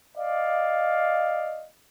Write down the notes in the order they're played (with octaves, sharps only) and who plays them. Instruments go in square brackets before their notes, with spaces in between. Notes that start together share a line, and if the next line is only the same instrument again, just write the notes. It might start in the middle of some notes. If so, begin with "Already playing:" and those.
[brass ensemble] D5 D#5 F5